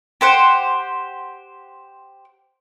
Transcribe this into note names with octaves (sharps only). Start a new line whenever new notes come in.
G4 C5 F#5